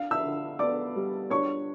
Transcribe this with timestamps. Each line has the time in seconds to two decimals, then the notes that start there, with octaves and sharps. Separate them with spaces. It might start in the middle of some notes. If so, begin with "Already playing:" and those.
Already playing: D4 F5
0.11 E5 E6
0.23 D3
0.59 B3 D5 D6
0.96 G3
1.30 D4 C#5 C#6